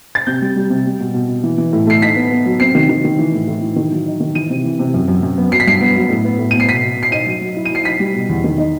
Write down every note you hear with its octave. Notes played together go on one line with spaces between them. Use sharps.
A6
C3 G6
G3
G3
C3
G3
B2
B2
B2
E3
E3
A2
A3 C7
D#4 B6
B3
B3
F#3
C4 C7
D#3
D#3
D#3
E3
A2
A2
E3
D#3
F#3
D#4
D#3
E3 D#7
C3
E3
C3
F#2
F#2
F#2
B3
F#3 C7
B6
G2 C7
B3
F#3
A2
B3
A2
B3 D#7
C7
B2 B6
B2
B2
C7
D#4 D#7
F#3
F#3
E4
D#7
F#3 C7
D#4 B6
G3
B2
E2
D#3
D#4